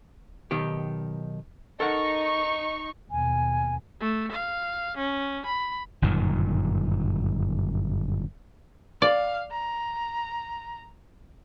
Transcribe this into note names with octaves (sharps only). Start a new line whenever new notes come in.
B1 D#3 G4
D#4 A4 A#4 F#5 C#6
D#2 B2 G#5
A3
F5
C#4
B5
G1 F#2 A#2 D#3
D5 F5
A#5